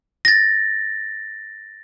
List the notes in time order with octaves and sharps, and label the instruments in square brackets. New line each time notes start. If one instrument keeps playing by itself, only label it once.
[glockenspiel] A6 A#6